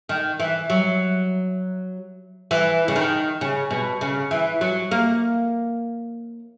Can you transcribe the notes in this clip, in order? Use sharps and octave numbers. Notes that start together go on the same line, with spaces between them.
D#3
E3
F#3
E3
C#3
D#3
C#3
B2
C#3
E3
F#3
A#3